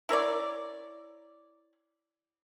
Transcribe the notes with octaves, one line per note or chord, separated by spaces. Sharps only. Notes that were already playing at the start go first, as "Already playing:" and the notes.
E4 A#4 C#5 D5